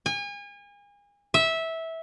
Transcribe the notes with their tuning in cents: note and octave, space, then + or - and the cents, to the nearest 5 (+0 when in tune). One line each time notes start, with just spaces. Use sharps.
G#5 -35
E5 -15